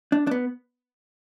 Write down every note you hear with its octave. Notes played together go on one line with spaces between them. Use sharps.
D4
D4
B3